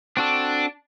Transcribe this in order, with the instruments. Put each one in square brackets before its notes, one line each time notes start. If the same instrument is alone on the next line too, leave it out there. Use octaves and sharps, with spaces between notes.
[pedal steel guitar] C4 F#4 A4 [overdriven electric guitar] D4